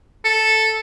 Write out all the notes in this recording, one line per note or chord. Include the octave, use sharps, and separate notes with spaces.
A4